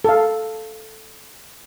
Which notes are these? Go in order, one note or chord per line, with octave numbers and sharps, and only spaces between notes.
A4 F5